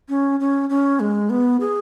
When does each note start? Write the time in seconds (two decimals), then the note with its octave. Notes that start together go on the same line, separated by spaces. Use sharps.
0.09 C#4
0.40 C#4
0.70 C#4
1.00 G#3
1.30 B3
1.60 G#4